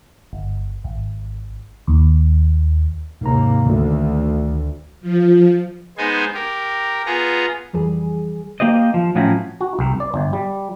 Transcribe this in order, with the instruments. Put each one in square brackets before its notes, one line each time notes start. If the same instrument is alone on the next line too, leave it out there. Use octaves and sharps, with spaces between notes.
[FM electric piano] G1
G#1
D#2
[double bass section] D#2 C3 A#3 [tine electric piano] G#2 A#5
[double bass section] D2 [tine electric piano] D#3 A3
[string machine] F3
[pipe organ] G#3 B3 D#4 C5 G#5
G4 A#4
B3 F4 G#4 A#5
[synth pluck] F2 E3 G3 G#4
[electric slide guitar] A#3 G4 C5 D#5
F3
A2 F3 F#3 C4 C#4 E4
[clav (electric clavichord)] F#4
C2
D5
G1
G3